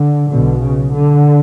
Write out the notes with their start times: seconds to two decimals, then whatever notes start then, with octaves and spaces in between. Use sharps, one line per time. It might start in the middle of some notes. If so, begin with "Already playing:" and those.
Already playing: D3
0.31 B1 B2 D3
0.61 C#3
0.92 D3